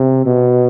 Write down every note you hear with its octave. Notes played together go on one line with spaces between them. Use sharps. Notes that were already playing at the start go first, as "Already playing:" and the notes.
Already playing: C3
B2